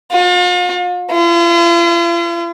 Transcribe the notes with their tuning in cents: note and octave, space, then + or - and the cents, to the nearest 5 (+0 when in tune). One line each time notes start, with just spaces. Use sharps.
F4 +40
F4 -45